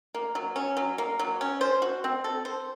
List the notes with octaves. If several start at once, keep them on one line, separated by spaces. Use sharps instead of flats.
A#3
F#3
C#4
F#3
A#3
F#3
C#4
C5
F#4
C4
A4
C5